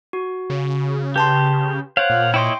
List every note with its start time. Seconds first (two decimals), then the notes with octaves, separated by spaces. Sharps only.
0.13 F#4
0.50 C#3
1.16 G4 B4 A5 C6
1.97 C5 C#5 F5 F#5
2.10 A#2
2.34 E4 C#5 D#5 G5 C6